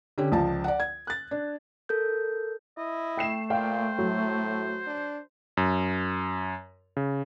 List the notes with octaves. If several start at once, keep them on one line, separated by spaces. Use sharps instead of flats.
D3 C#4 G4
C#2 F3 D5 A5
D5 F#5
G#6
F#6 A6
D4
A4 A#4 G6
E4 D#5
A3 G5 C7 E7
A#2 C5 F5 G5
A2 F#3
D4
F#2
C#3